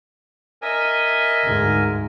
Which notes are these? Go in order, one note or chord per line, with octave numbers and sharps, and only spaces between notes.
A#4 D#5 E5 G#5
D2 G#2